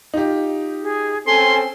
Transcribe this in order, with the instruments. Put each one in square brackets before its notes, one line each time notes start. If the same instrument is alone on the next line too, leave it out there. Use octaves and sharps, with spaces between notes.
[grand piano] D#4 F4 G4
[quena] G#4
[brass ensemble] C4 C#4 A4 [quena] G#5 [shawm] C6